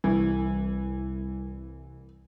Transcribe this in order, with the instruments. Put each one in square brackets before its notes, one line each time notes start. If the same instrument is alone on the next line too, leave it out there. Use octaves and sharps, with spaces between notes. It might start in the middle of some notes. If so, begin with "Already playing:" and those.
[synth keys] C2 [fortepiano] E3